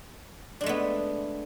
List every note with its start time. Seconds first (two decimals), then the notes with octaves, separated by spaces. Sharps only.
0.61 D4
0.64 G#3
0.66 A3
0.69 B3